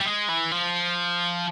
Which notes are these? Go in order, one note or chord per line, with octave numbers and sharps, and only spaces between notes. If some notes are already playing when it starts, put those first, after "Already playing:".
G3
G#3
E3
F3